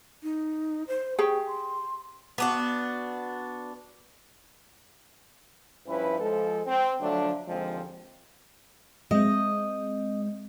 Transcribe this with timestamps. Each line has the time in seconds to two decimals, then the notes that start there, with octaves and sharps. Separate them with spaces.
0.23 D#4
0.88 C5
1.19 G4 G#4 G5 C#6
1.47 C6
2.38 B3 D4 F#4
5.87 G2 F3 C#4 E4 B4
6.20 F3 G#3 A4
6.66 C4
7.01 D3 F3 F#3 A3 D4
7.48 D#2 D3 F3 G#3 C4
9.11 G#3 C4 D#5